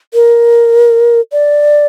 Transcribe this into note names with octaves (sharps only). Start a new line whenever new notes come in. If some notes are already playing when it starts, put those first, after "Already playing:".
A#4
D5